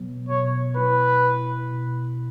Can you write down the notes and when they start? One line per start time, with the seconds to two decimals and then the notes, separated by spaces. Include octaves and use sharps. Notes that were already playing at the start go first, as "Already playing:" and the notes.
Already playing: B2 F#3 B3
0.29 B2 C#5
0.76 E4 B4
1.23 E4
1.71 B2